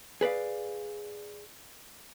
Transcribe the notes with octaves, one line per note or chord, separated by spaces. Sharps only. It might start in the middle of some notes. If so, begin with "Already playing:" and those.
G#4 B4 D5 F5